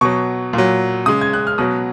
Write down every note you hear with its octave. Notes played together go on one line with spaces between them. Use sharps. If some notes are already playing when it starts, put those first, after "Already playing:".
B2 F#3 C#6
A#2 F#3
C#3 G#3 D#6
G#6
F#6
F6
B2 F#3 D#6